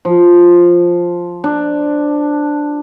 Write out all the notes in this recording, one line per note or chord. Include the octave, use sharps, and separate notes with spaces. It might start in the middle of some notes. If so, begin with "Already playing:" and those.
F3
D4